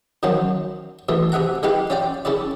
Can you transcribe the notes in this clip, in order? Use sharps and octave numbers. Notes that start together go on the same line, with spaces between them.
D#3 F3 F#3 C#4 F4
B2 E3 A3
C3 G#4 E5 F#5 A#5
G#3 D#4 E4 G4 B4 F5
C#4 F4 D5 G5
C#3 C#4 E4 D5